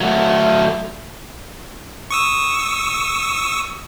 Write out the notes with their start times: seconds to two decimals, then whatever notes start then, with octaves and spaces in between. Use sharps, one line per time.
0.01 F#3 A3
2.11 C#6 D#6 E6